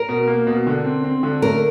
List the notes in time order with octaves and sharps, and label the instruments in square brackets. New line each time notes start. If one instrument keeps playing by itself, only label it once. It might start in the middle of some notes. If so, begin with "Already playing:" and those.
Already playing: [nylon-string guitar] A#4
[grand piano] B2
A#3
B2
D3
C4
C4
D3
[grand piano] A3 [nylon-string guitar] A#4